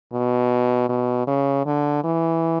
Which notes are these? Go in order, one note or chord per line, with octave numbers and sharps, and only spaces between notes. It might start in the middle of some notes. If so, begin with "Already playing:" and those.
B2
B2
C#3
D3
E3